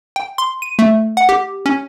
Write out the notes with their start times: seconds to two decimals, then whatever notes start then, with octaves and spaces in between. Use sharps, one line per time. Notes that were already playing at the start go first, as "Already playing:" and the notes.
0.16 G5
0.38 C6
0.62 D#7
0.79 A3
1.17 F#5
1.29 G4
1.66 C#4